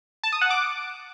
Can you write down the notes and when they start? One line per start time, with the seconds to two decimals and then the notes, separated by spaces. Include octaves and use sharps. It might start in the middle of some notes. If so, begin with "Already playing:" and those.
0.24 A5
0.32 D#6
0.41 F#5
0.50 D6